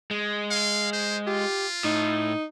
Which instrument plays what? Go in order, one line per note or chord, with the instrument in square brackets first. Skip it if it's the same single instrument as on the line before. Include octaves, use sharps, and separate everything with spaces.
[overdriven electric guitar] G#3
[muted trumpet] F5
C5
[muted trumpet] F4 [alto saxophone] G4
[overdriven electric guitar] A2 [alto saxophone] D#4